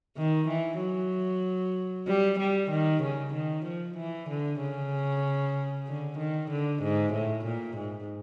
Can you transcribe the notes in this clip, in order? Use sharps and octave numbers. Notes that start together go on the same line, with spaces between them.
D#3
E3
F#3
G3
G3
D#3
C#3
D#3
F3
E3
D3
C#3
D3
D#3
D3
G#2
A2
A#2
G#2